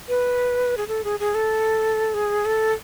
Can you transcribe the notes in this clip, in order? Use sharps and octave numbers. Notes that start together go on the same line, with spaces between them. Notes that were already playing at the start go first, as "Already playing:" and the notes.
B4
G#4
A4
G#4
G#4
A4
G#4
A4